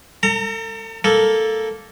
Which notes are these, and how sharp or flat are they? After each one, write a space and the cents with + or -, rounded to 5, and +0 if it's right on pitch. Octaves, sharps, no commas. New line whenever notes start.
A4 +40 A#5 -25
A#3 +0 A4 +0